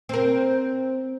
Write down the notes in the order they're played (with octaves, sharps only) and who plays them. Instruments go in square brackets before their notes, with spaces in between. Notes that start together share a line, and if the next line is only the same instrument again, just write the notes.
[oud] C4 A#4